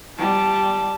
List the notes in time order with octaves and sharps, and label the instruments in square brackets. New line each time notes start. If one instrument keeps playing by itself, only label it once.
[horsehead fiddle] G3 A5